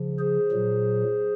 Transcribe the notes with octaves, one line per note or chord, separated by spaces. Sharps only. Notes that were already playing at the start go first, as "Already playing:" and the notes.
Already playing: C#3 F3
G#4 C5
A#2 F#3